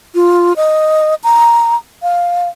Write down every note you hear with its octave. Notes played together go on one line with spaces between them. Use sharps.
F4
D#5
A#5
F5